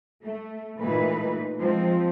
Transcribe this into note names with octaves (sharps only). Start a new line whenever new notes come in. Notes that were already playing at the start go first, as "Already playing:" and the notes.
A3
A#2 E3 G#3 A3 D#4 B4
F3 G#3 C4